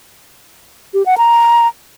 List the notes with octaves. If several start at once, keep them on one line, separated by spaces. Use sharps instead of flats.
G4
F#5
A#5